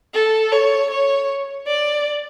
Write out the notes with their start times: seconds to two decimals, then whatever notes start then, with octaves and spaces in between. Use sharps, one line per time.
0.14 A4
0.52 C#5
0.91 C#5
1.67 D5